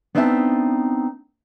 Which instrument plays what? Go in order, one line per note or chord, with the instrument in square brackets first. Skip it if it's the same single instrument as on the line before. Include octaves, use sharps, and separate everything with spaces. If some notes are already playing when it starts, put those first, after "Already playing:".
[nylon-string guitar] B3 C4 D4 D#4 E5 A5